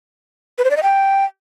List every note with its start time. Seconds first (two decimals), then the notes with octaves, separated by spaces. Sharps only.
0.58 B4
0.64 C5
0.71 D5
0.77 D#5
0.83 G5